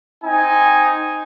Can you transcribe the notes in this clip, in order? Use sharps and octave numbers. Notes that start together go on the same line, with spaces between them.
C4 D#4 G#5